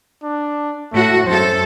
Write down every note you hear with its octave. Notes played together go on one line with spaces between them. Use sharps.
D4
A2 A3 F#4
F#2 A4 C5